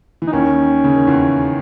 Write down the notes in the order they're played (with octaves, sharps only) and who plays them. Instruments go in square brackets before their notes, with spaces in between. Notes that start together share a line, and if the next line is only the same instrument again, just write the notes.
[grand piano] E3
[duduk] D#4
[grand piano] D#2 D#3 [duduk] C#4
[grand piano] C#3
D#3
E2 E3